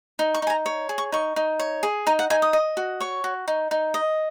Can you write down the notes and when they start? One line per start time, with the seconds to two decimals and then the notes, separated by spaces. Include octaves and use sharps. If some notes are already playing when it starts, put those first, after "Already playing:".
0.19 D#4
0.34 C#6
0.42 D#4 G#5
0.50 A#5
0.66 C#5
0.89 G#4
0.98 C#6
1.12 D#4 C#6
1.36 D#4
1.59 C#5
1.83 G#4
2.07 D#4 A#5
2.19 F#5
2.30 D#4 G#5
2.42 D#6
2.53 D#5
2.77 F#4
3.00 C#5 C#6
3.24 F#4
3.48 D#4
3.71 D#4
3.94 D#5